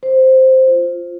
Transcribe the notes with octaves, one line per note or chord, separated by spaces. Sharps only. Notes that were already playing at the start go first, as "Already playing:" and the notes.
C5
F4